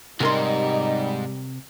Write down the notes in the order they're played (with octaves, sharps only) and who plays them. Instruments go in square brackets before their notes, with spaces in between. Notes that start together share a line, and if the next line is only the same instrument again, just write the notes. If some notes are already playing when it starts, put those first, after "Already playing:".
[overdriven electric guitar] G#2 [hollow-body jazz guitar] C3 A#4 C6 [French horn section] G3 [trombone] D#4